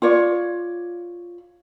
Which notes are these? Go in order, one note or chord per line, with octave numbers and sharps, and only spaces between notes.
F4 C#5 D5